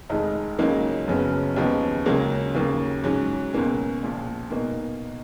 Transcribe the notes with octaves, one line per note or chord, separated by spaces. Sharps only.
F1 F2 D#3 G#3 D#4
C#2 C#3 F#3 A#3 D#4
F#1 F#2 C#3 F#3 B3
D#2 C#3 F3 B3 D#4
C#2 C#3 F#3 A#3 C#4
D#2 C#3 F#3 A#3
G#2 F#3 C#4
C#2 B2 A#3 C#4
A#1 A#2 F3
B2 A#3 D#4